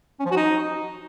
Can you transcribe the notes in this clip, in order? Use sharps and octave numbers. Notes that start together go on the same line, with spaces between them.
C#4
F3
F#4
D#4